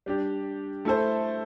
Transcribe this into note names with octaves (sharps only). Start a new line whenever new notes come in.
G3 D4 G4
A3 E4 A4 C5